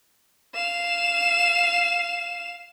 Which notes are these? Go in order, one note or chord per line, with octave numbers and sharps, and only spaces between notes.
F5 E7